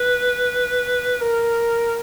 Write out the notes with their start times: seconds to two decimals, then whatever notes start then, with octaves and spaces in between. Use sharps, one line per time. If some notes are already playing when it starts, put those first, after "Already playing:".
Already playing: B4
1.21 A#4